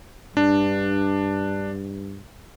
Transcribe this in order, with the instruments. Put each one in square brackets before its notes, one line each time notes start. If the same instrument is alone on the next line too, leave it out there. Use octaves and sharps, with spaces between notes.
[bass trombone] G2 [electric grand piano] D4